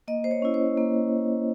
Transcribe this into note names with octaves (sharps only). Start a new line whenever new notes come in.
A#3 D#5
C5
C#5
C#4 E4
C5
A#3